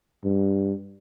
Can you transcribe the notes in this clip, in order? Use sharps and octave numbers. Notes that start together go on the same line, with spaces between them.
G2